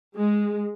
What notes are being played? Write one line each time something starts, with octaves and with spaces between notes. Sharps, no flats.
G#3